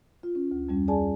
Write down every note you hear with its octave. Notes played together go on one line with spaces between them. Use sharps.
F4
C#4
D2
F2 G3 C#4
G#4 D5 G#5 A5